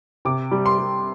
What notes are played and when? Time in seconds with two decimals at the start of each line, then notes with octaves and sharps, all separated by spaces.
0.25 C3 D6
0.51 G3
0.66 C6
0.79 G3